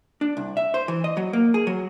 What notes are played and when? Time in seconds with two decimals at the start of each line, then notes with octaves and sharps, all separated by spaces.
0.21 D4
0.37 C2
0.57 E5
0.74 C5
0.88 E3
1.04 D#5
1.17 F#3
1.33 A#3
1.54 G#4
1.67 F#3